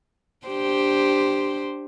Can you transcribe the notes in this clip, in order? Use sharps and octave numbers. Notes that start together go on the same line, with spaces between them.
D4 G4 C5